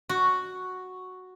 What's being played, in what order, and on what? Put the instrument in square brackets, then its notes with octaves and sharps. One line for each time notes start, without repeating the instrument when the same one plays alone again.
[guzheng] F#4